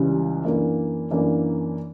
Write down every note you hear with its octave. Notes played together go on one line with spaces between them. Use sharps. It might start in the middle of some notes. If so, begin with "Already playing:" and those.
Already playing: C#2 C#3 E3 G3
F#2 E3 A#3 D4
F#2 E3 A#3 D4